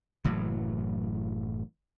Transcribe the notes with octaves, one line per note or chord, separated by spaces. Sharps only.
F#1 A2 E3 F#3